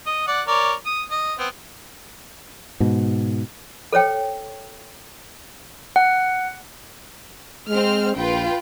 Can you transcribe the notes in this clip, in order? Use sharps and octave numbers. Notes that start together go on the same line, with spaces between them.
D#5
D5 F#5
A#4 C#5 D5
D#6
D#5
B3 C4
G#2 B2
A4 C5 C#5 G5
F#5
G#3 C4 F6
A#1 F4 B4 G5